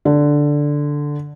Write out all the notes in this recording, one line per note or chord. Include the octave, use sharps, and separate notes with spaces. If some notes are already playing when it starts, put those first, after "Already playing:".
D3